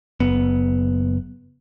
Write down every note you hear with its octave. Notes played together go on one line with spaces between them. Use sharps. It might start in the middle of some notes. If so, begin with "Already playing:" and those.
F#1 B3